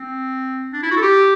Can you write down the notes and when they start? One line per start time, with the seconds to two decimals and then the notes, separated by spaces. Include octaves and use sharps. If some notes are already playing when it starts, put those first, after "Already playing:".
Already playing: C4
0.73 D4
0.83 E4
0.91 F#4
0.97 A4
1.02 G4